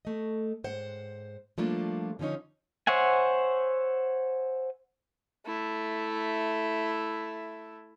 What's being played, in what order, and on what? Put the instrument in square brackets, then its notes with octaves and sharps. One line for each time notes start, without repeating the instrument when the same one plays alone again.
[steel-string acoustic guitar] A3 D#5
G#2 C5 F#5
F3 G3 A3 A#3 D4 F4
D3 F3 C#4 D#4 C#5
[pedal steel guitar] C5 C#5 E5 F#5 G#5
[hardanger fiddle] A3 E4